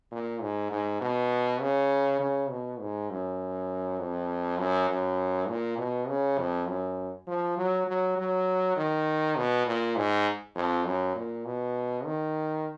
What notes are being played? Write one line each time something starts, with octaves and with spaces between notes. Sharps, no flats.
A#2
G#2
G#2
B2
C#3
C#3
B2
G#2
F#2
F2
F#2
F#2
A#2
B2
C#3
F2
F#2
F3
F#3
F#3
F#3
D#3
B2
A#2
G#2
F2
F#2
A#2
B2
D#3